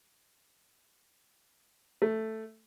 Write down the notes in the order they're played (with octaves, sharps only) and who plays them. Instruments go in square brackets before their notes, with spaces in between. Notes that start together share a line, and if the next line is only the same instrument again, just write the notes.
[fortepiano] A3